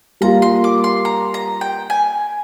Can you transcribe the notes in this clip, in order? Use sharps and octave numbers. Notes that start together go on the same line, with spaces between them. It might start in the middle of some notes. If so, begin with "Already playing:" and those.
G3 A#3 F4 A#5
C6
D6
C6
A#5
A#5
G5
G#5